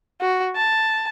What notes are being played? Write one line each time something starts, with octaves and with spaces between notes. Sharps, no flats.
F#4
A5